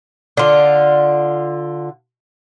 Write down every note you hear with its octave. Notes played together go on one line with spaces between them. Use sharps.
D3 F4